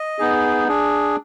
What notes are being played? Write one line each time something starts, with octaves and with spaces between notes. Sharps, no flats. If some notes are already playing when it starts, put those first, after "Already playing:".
Already playing: D#5
B3 D#4 G#4
D4 G#4